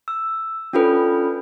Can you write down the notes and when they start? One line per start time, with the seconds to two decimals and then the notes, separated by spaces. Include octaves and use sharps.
0.08 E6
0.73 C#4 D4 F4 A4 B4